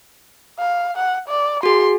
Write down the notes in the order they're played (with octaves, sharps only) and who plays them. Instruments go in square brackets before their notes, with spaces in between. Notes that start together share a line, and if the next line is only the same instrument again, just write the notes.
[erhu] F5
F#5
D5
[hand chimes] F#4 G#4 [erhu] C6